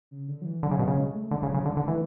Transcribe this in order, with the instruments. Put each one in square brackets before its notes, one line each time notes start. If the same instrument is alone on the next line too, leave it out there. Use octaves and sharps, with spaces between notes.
[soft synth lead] C#3
D3
F#3
E3
[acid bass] D3 [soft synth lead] F#3
[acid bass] C#3
[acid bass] B2 [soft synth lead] F#3
[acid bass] C#3
[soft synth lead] G#3
A3
[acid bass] D3 [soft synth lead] G#3
[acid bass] C#3
[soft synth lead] F#3
[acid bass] C#3
[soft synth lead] F#3
[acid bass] D3 [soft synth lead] G#3
[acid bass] D3
[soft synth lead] A3
[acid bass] E3